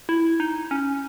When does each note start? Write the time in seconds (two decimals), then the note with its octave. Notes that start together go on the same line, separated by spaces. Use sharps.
0.09 E4
0.40 D#4
0.71 C#4